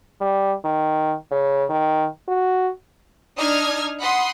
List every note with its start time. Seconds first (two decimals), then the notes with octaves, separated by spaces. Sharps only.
0.21 G3
0.64 D#3
1.31 C#3
1.69 D#3
2.28 F#4
3.37 D4 D#4 D#6 F6 G#6
4.00 F#5 B5 C6 D#6